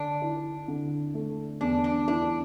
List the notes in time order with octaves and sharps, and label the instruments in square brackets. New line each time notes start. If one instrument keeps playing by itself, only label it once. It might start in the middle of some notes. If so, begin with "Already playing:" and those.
Already playing: [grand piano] D3 [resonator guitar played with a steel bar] D4
[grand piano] E4
D3
A3
[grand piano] E2 [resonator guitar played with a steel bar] D4
[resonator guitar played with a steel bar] D4
[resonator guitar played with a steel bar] D4 [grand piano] E4